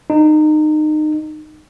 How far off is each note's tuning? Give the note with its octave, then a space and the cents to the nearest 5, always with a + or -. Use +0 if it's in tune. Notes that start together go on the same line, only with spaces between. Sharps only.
D#4 -25